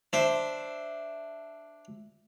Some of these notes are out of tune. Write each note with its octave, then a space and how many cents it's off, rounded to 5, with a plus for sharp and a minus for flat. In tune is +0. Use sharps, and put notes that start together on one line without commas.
D4 +0 C5 +0 E5 +0